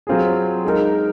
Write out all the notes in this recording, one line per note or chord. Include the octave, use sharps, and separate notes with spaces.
F#3 C4 F4 G#4
G#3 D#4 A#4